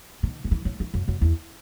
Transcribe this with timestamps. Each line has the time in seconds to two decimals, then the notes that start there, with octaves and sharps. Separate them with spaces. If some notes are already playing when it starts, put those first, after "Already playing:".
0.23 D#3
0.44 D#3
0.51 E3
0.65 F#3
0.80 E3
0.94 F#2
1.08 F#2
1.21 E2